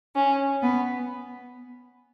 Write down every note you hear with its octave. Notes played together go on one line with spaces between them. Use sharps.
C#4
B3